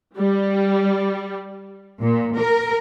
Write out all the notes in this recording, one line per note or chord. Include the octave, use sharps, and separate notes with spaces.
G3
A#2
A#4